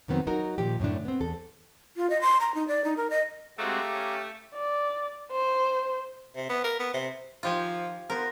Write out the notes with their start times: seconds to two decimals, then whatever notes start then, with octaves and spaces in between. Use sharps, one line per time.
0.08 F2 D#3 F#3 B3 C4
0.27 F#3 D#4 F#4 A#4
0.58 A#2 D#3 F3 G4
0.80 F#2 A2 D3 D4
1.05 B3 C4
1.21 E2 A4
1.97 F4
2.10 D#5
2.21 C6
2.40 A#5
2.55 D#4
2.68 D5
2.84 D#4
2.97 A#4
3.10 D#5
3.58 G#3 A3 C4 F#4 G4 F5 A#5 D6
3.92 C#4
4.54 D5
5.31 C5
6.36 C3
6.49 B3
6.64 A#4
6.79 B3
6.93 C3
7.43 D#3 F3 F4 G4 G#5
8.10 B3 A#4 C5